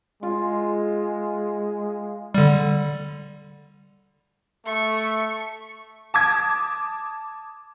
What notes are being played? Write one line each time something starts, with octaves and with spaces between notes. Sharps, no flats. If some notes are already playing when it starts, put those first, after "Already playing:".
G#3 F4
D3 G3
A3 C#6
A5 D6 D#6 G#6